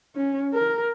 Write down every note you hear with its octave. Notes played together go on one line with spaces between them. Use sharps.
C#4
A#4